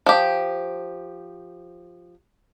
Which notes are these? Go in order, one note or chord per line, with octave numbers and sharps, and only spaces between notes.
F3 G4